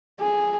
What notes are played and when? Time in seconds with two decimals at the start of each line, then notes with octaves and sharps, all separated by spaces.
0.20 G#4